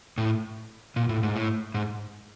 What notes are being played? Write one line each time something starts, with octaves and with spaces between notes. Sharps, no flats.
A2
A#2
A2
G#2
A2
G#2